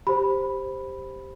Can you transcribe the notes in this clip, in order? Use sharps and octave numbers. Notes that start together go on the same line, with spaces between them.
G4 C5 B5